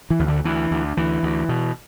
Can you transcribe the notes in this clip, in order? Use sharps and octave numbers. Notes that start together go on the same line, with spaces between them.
E3
D2
D3
D2 E3
D2
D2 E3
D2
B2